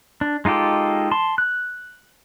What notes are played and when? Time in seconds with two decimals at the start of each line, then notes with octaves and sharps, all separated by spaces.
0.21 D4
0.45 G#3 D#4 F4 G4 A4
1.11 A5 C6
1.38 F#6